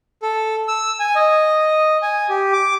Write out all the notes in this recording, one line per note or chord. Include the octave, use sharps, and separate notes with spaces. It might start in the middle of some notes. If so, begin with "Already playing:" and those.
A4
E6
G#5
D#5
G#5
G4
D6